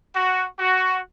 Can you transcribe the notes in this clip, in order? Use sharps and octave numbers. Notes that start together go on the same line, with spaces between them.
F#4
F#4